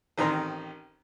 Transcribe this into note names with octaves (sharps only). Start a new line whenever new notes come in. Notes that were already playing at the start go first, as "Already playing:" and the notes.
A1 D#3 C4 A#5 C6